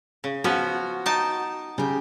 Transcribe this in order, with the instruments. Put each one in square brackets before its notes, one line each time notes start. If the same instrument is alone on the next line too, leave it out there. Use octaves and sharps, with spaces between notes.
[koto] C#3
[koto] F3 B3 C#4 [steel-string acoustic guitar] F#4
[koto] D#4 G5 A5
[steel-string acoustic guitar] C#3 G4